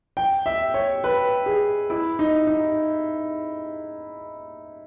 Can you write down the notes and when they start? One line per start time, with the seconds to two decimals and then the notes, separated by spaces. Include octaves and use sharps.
0.17 G5
0.46 E5
0.74 C#5
1.04 B4
1.46 G#4
1.90 E4
2.19 D#4
2.47 D#4